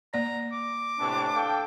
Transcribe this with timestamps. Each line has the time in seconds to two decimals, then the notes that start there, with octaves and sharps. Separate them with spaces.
0.14 A#3 D5 A#5
0.52 D6
0.99 A2 C3 E3 D4
1.36 A4 F5 G5